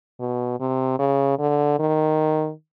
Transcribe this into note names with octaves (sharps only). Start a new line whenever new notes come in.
B2
C3
C#3
D3
D#3